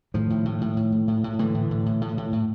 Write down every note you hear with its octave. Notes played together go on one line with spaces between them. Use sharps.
A2 D#3 F3
A2
A2
A2
A2
A2
A2
A2
A2 D3 E3
A2
A2
A2
A2
A2
A2